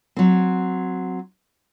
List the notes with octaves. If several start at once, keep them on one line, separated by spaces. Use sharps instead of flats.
F#3 C4